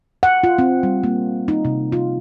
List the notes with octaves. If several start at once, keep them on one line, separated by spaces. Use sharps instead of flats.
F#5
F4
C4
G3
A#3
D#4
C3
F4